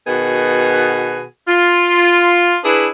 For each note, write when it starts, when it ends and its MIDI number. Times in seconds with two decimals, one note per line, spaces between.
0.07 1.23 47
0.07 1.23 51
0.07 1.23 59
0.07 1.23 66
0.07 1.23 68
1.47 2.57 65
2.63 2.87 62
2.63 2.87 64
2.63 2.87 68
2.63 2.87 71